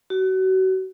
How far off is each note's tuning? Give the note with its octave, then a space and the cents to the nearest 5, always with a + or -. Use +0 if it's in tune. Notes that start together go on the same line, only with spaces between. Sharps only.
F#4 +30